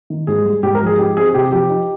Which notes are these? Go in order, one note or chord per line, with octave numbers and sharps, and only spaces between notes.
D#3
G#2 G#4
G3
G#2 G4
A#4
F3
G#4
D#4 G4
C4 G#4
G#4
C3 G4
F3 G4
D#4